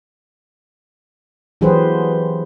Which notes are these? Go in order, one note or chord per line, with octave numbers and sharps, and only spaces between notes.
E3 F#3 G4 G#4 B4 C5